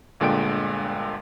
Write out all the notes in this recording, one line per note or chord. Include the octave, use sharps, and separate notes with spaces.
G1 A#2 D3 G#3 G5 D7